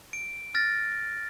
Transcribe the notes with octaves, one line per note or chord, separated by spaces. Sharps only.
D7
F6 A6 A#6